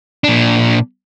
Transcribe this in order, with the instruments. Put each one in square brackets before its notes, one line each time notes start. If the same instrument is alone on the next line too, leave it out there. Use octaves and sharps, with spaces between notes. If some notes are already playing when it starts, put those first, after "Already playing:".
[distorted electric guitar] A#2 D4